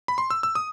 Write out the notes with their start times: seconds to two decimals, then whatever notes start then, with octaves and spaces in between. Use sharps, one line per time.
0.08 B5
0.18 C6
0.30 E6
0.43 E6
0.55 D#6